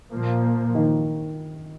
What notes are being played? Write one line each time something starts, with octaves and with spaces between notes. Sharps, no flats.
A#2 F3 A#3
D#3